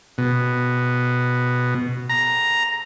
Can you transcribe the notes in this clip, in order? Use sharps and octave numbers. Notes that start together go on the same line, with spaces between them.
B2
A#5